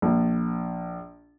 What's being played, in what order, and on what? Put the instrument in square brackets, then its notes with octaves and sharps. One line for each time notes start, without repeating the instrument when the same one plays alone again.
[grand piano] A#1